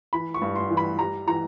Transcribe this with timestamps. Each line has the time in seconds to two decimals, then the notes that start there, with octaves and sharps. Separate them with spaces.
0.13 E3 B5
0.34 C#6
0.42 G2
0.56 C6
0.70 E3
0.77 B5
0.99 G3 A#5
1.27 E3 A#5